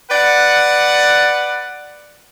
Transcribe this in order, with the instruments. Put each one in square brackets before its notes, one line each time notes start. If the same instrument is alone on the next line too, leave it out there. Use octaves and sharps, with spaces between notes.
[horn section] B4 D5 F#5